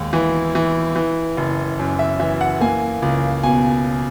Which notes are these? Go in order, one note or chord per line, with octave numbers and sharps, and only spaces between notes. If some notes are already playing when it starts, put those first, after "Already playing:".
Already playing: D#2 G#3
E3
E3
E3
F#1
F#2
E5
E3 E5
F#5
A#3 G#5
C#2
B2 G#5